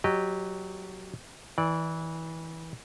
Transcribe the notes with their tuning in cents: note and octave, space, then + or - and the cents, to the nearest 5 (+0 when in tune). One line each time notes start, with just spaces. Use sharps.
F#3 +0 G4 +0 D#5 -20
E3 -20 D5 +0